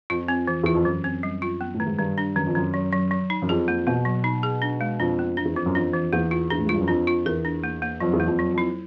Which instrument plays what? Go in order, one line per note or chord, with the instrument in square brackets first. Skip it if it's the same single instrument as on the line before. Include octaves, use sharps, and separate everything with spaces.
[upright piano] F2 [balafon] F4
[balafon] C4
E3
[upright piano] E2 [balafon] F4
[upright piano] F2
[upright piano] F#2 [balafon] E3
[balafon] C4
G3
F4
B3
[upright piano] A2
[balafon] D#3
[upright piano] G#2
[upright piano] G2 [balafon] D#3
[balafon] D4
[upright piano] F#2 [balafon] D#3
[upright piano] F2
[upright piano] F#2 [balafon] D#3
[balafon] F#3
F#3
F#3
D#4
[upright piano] F#2
[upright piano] F2 [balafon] G#4
[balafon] A#3
[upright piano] B2 [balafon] A#3
[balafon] F#3
D#4
G#4
D4
G#3
[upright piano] F2 [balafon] D4
[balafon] B3
[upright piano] F2 [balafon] D4
[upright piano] E2
[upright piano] F2 [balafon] E3
[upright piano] F#2
[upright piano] F2 [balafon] D4
[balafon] E3
[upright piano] E2 [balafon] A#3
[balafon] F4
[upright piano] E2 [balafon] D4
[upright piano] A2
G#2
[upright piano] G2 [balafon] F4
[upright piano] F#2
[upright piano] F2 [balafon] D4
[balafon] F4
[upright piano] E2 [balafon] A#4
[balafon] D4
A#3
A#3
[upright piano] F2 [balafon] F#3
[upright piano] E2
[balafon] A#3
[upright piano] F2
[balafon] F#3
[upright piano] F2 [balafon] E4